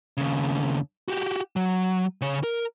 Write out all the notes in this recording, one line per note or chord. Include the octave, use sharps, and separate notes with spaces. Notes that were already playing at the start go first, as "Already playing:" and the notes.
D#2 C#3
F#4 G4
F#3
C#3 C#5
A#4